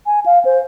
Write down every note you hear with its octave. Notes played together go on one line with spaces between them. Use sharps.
G#5
F5
C5